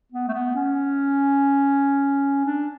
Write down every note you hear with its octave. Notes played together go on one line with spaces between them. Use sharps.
B3
A3
B3
C#4
D4